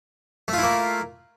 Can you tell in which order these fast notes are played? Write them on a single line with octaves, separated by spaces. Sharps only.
A3 F4 E4 A#3